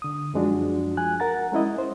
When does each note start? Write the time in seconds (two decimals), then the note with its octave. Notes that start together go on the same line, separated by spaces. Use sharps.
0.02 D3 D#6
0.34 F#2 F3 G#3 D4 F#4
0.97 F3 G#5 F#6
1.20 A#4 F#5 A#5 A6
1.52 G#3 C#4 E4 D#5
1.78 C5